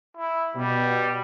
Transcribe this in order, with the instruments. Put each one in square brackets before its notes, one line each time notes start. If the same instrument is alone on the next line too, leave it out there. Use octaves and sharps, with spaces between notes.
[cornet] E4
[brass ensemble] B2 [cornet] G3